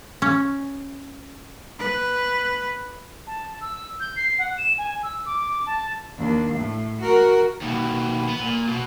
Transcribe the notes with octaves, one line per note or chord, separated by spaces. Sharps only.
C#4
B4
A5
E6
G6
C7
F#5
E7
G#5
E6
D6
A5
D#2 D4
A2
F#4 A#4
D#2 B2
B3
A#2
B2